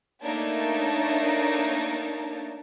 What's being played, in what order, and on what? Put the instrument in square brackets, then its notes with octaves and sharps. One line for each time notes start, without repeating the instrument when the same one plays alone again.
[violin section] A3 A#3 D4 D#4 C#5 A5